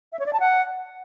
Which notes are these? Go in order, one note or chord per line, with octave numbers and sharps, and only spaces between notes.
E5
C#5
D5
A5
F#5